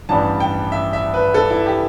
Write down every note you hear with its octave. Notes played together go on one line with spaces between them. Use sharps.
A1 G2 E3 G3 A5
G5
E5
E5
B4
A4
E4
G4